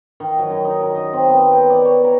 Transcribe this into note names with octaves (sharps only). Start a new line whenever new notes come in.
D#3
F#3
F#2
D#4
A#4
D#5
C4
B3
G5
D5
C#5
A#4